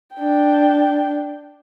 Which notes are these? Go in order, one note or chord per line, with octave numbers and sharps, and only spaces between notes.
D4 G5